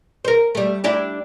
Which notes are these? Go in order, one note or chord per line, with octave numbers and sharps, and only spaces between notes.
A#4 C5
G3 A3
D4 E4 G4